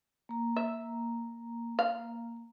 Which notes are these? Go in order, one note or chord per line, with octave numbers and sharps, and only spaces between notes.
A#3 A#5
E5
F5